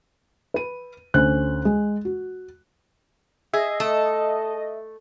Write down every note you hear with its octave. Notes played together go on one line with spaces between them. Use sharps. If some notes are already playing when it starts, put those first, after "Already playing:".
B4 D#7
D2 C#4 C5 F#6
G#3
F#4
G#4 D#5 E5
A3 A4